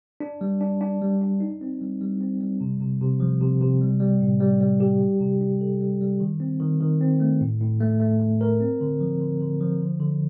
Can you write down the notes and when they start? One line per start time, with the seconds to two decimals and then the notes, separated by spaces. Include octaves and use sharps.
0.20 D4
0.41 G3
0.61 D4
0.81 D4
1.02 G3
1.21 D4
1.40 D#4
1.61 C4
1.81 G3
2.01 G3
2.21 C4
2.41 G3
2.61 C3
2.80 C3
3.01 C3
3.20 F3
3.41 C3
3.61 C3
3.81 G3
4.00 G3
4.21 A2
4.40 G3
4.61 G3
4.80 G4
5.01 G3
5.21 C3
5.41 D4
5.61 A4
5.80 G3
6.01 G3
6.20 D#3
6.40 C4
6.60 D#3
6.80 D#3
7.01 C4
7.20 A3
7.41 A2
7.61 A2
7.81 A3
8.00 A3
8.20 A3
8.41 A#4
8.60 C4
8.81 D3
9.01 F3
9.20 D3
9.41 D3
9.61 F3
9.81 D3
10.00 D3